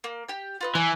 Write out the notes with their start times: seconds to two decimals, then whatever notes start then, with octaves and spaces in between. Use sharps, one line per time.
0.04 A#3
0.28 G4 G5
0.61 F4 B4 D#5
0.75 E3 C#5 E5 G#5